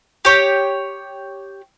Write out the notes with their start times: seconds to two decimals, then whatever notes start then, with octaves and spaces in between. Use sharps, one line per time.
0.25 G4 C#5